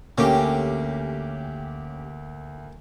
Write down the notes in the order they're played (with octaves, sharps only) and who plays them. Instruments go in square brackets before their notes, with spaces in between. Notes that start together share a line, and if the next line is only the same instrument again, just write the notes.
[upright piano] D2 [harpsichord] A#3 [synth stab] C#4 G4